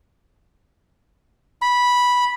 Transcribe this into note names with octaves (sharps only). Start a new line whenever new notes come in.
B5